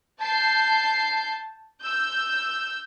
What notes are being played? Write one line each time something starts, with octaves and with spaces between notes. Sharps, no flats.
A5 G6 C7
E6 G6